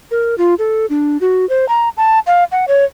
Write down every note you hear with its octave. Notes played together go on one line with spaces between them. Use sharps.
A#4
F4
A4
D4
F#4
C5
A#5
A5
F5
F#5
C#5